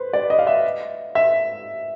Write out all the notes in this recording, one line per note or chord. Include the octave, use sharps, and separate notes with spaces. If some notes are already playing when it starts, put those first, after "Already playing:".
Already playing: B4 C5
D5
D#5
F5
E5
E5